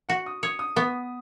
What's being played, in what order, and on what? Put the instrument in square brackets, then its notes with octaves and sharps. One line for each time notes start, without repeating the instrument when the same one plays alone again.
[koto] F#4 [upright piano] F#5
[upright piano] D#6
[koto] C#5 [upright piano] D#6
[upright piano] D#6
[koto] B3 [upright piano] C#6